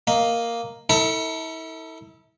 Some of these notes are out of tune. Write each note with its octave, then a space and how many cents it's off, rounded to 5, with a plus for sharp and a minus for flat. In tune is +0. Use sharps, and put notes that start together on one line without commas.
A#3 +0 D#5 +0
E4 -35 A4 +30